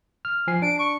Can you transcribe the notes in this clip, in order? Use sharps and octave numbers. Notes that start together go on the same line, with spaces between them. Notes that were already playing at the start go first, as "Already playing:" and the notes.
F6
F3 G#5 C7
D4 D7
C#6